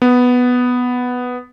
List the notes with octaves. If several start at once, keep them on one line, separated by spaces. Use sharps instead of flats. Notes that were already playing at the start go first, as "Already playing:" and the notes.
B3